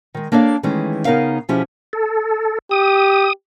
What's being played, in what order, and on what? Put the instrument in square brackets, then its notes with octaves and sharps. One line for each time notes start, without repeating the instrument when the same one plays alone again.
[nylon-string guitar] D#3 G#3
A#3 D4 A4 C#5 E5 F5
D#3 E3 G#3 A3 C#4
C#3 B3 D#4 A#4 C#5 F5
B2 F3 C#4 E4 G4 G#4
[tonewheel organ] A4
[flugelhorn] G4 [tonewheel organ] D#6